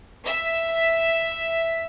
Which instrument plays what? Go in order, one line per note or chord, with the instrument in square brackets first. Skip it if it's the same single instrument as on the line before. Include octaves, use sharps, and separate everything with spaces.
[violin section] E5